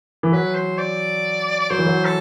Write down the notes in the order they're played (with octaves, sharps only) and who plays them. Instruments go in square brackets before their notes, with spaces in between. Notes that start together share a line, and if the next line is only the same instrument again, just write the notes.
[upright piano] E3
[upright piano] F#3 [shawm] B4
[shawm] C5
D5
D5
[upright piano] F#3 [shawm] C5
[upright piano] E3
F#3
[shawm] A4